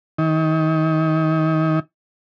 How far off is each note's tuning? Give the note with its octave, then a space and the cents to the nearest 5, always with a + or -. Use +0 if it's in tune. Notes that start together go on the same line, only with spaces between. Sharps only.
D#3 +30